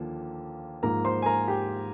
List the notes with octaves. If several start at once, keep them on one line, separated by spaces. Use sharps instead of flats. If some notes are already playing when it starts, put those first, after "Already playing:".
Already playing: D#2 D3 F3 A#3
G#2 F3 A#3 F4 A#4 A#5
C5 C6
G#5
A#4 A#5
G4 G5